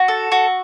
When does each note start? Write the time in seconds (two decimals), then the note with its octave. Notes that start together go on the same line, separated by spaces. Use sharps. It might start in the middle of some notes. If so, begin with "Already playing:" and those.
Already playing: F#4
0.08 A4
0.32 F#4